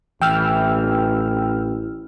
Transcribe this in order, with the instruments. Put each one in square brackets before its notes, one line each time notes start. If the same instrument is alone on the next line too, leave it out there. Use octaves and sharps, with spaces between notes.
[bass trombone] A1 [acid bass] E3 [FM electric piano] G5 E6 F6